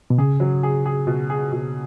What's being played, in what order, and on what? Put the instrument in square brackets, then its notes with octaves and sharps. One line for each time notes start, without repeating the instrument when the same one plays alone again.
[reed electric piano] B2
[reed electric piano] C#3 [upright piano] G#4
[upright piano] F#3
G#4
G#4
B2
G#4
B2